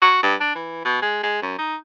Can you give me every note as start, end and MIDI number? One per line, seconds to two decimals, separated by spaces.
0.02 0.19 66
0.23 0.35 43
0.40 0.55 62
0.55 0.80 52
0.85 0.99 47
1.02 1.22 56
1.23 1.40 56
1.42 1.56 42
1.59 1.76 63